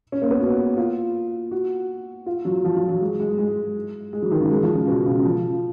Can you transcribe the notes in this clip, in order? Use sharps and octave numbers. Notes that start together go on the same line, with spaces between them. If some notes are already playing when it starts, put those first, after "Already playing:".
C#4
A#3
B3
F#4
F4
F#4
F4
F#3
F3
F3
F#3
G#3
G#3
G#3
G#3
F#3
D#3
C#3
G#3
F3
C#3
B2
C#3
F3